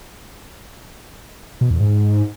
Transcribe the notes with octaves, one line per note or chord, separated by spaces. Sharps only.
B2
E2
G#2